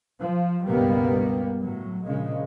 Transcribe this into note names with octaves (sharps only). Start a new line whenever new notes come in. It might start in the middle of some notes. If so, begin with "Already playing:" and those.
F3
C#2 G2 B2 G3 A#3 B3
A2 F#3
A#1 A#2 C#3 G#3